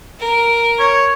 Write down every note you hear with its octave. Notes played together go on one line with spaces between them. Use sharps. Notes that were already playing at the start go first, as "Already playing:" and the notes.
A#4
C#5